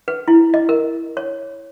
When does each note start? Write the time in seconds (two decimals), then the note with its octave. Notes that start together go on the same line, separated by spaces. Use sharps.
0.08 B4
0.28 E4
0.54 D#5
0.69 A#4
1.17 C#5